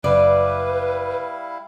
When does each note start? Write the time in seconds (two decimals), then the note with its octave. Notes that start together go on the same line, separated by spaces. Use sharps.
0.04 F#1 G3 E4 B4 D5 F5